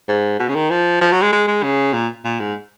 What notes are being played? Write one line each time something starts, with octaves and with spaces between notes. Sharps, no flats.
G#2
B2
C#3
D#3
F3
F3
F#3
G#3
G#3
G#3
C#3
A#2
A#2
G#2